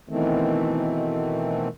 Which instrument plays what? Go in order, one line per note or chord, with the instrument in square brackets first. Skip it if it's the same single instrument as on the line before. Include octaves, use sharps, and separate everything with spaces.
[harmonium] B2 D#3 E3 A3 C4